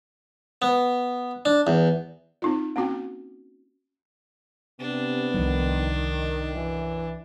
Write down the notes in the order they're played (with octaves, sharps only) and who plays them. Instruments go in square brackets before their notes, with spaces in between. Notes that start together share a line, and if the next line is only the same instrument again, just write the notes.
[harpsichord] B3
D4
E2
[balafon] C4 D#4 F4
A#3 C4 C#4 F#4 G5
[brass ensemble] C3 [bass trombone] B3 [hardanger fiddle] D4
[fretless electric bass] C2 F3 F#3 [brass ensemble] D#3
[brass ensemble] F#2 [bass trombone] E3